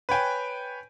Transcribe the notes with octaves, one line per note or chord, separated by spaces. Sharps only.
B4 C#5 G5 G#5